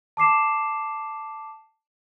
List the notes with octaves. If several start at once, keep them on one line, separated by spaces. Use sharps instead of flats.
A5 D6 C7 E7